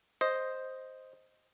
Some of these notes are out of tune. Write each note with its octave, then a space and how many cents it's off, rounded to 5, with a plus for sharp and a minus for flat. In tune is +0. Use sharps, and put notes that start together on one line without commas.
C5 +0 D#5 +0